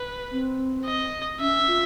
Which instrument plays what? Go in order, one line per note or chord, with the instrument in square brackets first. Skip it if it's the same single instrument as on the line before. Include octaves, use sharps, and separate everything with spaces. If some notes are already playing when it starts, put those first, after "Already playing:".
Already playing: [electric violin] B4
[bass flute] C4
[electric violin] D#5
[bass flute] C#4 [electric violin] E5
[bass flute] F4